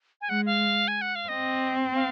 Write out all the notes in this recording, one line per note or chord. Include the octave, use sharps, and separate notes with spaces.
G#5
G#3 F#5
F5
G#5
F#5
F5
C4 D#5
F5